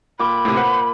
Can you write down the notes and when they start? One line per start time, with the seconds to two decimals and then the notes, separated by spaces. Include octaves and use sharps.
0.19 A#2 B5 D6
0.45 A2 C3
0.57 B4 C5 F#5